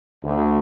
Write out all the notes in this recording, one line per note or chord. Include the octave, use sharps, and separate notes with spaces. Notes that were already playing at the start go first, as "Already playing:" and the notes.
D2